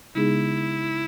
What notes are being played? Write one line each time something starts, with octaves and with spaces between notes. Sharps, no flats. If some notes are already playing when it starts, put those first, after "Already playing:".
C#3 G#3 B3 D#4 E4 G#4